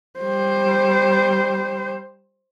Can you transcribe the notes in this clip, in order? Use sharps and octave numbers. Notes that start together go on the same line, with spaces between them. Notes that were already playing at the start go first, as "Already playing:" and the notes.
G3 C5